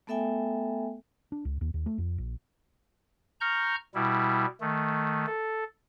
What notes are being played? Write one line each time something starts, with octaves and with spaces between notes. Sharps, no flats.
A3 B3 A4 E5 G5 G#5
D4
C#2
D#2
D#2
A3
F2
A#1
A#5 C#6 F6 G6
B2 G3 E4
D#3 A3
A4